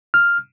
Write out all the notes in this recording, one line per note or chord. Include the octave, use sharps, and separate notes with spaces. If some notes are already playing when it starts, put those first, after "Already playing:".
F6